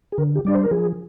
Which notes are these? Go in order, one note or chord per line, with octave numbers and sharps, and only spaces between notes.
G#4
D3 A#4
G4
G3 D4 D5
C5
A#4
F3 G#4